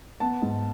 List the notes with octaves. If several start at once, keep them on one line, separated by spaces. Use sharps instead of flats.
B3 A5
G#2